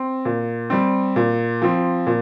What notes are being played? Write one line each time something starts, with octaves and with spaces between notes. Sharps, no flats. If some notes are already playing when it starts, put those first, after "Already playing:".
Already playing: C4
A#2
G3 C4
A#2
F3 C4
A#2